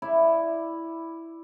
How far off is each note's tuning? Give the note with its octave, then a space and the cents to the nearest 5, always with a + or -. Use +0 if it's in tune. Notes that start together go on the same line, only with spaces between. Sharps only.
E4 +0 D5 +5